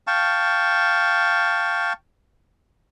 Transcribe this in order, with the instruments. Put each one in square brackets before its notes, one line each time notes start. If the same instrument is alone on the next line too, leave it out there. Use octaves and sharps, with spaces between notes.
[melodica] F5 G5 A5 C#6